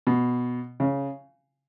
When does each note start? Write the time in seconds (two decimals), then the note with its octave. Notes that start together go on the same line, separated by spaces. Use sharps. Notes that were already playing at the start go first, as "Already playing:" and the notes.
0.07 B2
0.80 C#3